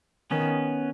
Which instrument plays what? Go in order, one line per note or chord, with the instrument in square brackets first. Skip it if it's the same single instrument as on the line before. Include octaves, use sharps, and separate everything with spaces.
[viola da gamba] D#3 [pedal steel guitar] B3 C#4